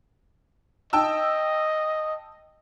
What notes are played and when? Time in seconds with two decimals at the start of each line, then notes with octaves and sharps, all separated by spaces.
0.93 D#5 G5 A5 E6